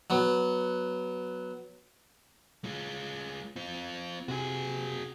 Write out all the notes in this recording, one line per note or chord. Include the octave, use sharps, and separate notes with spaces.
F#3 B3
G#3 F4
C4 F4
C3 F#4 G#4